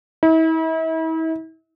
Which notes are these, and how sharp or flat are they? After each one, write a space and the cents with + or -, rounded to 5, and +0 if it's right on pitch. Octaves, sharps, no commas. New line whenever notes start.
E4 -40